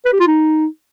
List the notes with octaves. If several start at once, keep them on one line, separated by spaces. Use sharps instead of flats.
B4
G4
F4
D#4